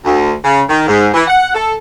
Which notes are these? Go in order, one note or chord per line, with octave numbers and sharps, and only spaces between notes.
D2
C#3
D#3
G#2
E3
F#5
A4